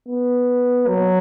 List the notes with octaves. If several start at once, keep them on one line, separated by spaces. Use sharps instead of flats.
B3
F#3